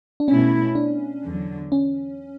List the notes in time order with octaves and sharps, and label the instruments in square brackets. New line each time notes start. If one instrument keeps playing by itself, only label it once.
[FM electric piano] D4
[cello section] B2 A3 E4 [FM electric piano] C#4
[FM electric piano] D4
[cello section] E2 D3 F#3
[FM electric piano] C#4